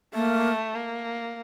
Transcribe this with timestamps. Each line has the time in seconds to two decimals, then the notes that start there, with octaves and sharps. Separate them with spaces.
0.14 A3 A#3
0.75 A#3